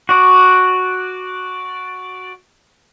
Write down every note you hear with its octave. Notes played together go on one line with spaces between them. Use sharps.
F#4 D5